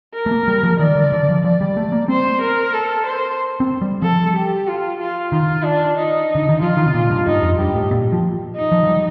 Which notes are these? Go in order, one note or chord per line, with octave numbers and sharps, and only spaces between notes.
A#4
A3
A#3
G3
F3
D#3 D5
D3
D3
F3
F3 D5
G3
A3
A#3
C4 C5
A#4
A4
C5
C4
G3
F3 A4
G4
F4
F4
D#3 F4
D4
D#4
D3
D#3
F3 F4
D#3
C3
A#2
G2
G2 D#4
F2
G2 G4
A2
A#2
F3
D#4
F3
F3
G3